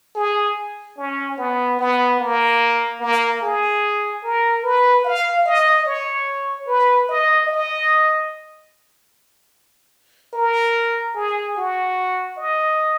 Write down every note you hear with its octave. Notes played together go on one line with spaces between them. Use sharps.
G#4
C#4
B3
B3
A#3
A#3
G#4
A#4
B4
F5
D#5
C#5
B4
D#5
D#5
A#4
G#4
F#4
D#5